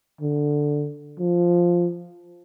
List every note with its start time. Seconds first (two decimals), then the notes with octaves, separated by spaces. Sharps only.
0.21 D3
1.19 F3